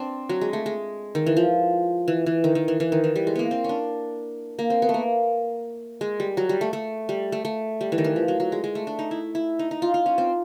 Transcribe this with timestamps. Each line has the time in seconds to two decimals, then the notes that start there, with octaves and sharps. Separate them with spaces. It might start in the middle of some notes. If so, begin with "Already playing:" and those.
Already playing: C4 D4
0.29 F#3
0.41 G#3
0.53 A3
0.66 G#3
1.15 D#3
1.26 E3
1.37 F3
2.08 E3
2.26 E3
2.44 D#3
2.55 D#3
2.68 E3
2.80 E3
2.92 D#3
3.04 E3
3.16 G3
3.27 G#3
3.36 A#3 B3
3.51 C4
3.64 C#4 D4
4.59 A#3
4.70 C4
4.82 B3
4.89 A3
4.94 A#3
6.01 G#3
6.20 G3
6.37 F#3
6.49 G3
6.61 A3
6.73 A3
7.09 G3
7.32 A3
7.45 A3
7.81 G3
7.92 E3
7.98 D#3
8.04 E3
8.16 F3
8.28 F#3
8.40 F#3
8.52 G#3
8.64 G#3
8.75 A3
8.87 D4
8.99 D#4
9.11 E4
9.35 E4
9.59 D#4
9.71 D#4
9.82 F4
9.94 F4
10.06 C#4
10.18 C4